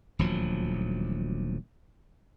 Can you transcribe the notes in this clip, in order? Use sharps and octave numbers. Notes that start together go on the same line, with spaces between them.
D#1 D2 F3 F#3